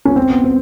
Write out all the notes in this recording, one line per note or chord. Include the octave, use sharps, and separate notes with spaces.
C#4
C4
B3
C4